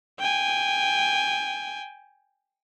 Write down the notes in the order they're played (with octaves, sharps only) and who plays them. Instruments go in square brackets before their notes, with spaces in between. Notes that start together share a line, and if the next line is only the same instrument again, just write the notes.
[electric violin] G5 G#5